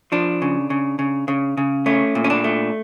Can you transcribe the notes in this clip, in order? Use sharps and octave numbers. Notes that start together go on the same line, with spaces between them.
F3 D4
C#3
C#3
C#3
C#3
C#3
A3 C#4
A#2
C#4
D4
A3